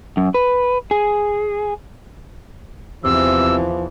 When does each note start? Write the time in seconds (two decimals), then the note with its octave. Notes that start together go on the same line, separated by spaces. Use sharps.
0.17 F#2
0.34 B4
0.91 G#4
3.04 E2 C3 E3 F3 E6